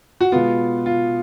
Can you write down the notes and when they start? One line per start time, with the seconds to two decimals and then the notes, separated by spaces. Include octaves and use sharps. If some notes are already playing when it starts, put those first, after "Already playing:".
0.20 F#4
0.32 B2 G#3 B3 F4
0.86 F4